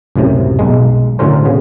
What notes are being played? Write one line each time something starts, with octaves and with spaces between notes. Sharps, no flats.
C#2 F#2 A2 C3
B1 G#3
A2 D3 F#3 C#4 A#4 C5
C#3 B3